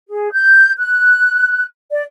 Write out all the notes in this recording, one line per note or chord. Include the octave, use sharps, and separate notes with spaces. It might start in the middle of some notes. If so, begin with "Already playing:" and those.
G#4
G6
F#6
D5